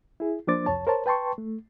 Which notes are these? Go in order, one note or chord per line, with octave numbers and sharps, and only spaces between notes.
E4 G#4
F3 A#3 D4 C5 D6 A6
C2 F2 C#5 A5
A#4 C5 C#5 A5
B4 G5 A5 C6 C#6
A3